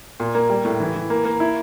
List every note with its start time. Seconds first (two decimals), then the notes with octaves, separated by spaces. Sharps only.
0.20 A#2
0.35 A#3
0.50 G3
0.65 A2
0.80 E3
0.95 E3
1.10 A#3
1.25 A#3
1.40 E4